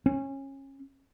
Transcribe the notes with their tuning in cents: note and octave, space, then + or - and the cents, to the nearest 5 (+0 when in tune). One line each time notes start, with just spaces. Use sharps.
C#4 -25